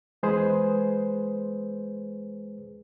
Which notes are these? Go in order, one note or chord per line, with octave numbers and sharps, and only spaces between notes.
E2 G#3 G#4 B4 C5